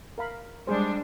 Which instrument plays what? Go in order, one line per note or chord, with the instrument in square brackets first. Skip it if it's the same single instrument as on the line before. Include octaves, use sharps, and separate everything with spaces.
[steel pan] A#4 F5 B5
[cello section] G3 G#3 D4 [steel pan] G#4 C5